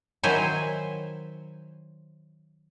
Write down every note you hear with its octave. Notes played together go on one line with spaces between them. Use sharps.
D#3 F#3 E4 C5 G#5